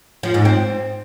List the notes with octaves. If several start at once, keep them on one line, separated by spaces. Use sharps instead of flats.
F3
G#2
C4